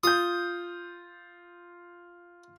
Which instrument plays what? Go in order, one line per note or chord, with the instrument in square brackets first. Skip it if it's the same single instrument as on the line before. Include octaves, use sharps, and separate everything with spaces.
[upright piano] F4 G6 [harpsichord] D#6